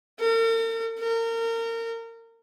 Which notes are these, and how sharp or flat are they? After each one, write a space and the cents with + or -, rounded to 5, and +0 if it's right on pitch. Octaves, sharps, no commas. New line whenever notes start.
A#4 -45
A#4 -30